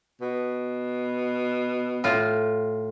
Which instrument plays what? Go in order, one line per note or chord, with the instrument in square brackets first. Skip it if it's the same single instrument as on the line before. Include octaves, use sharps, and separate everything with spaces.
[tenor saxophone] B2
[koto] A2 F4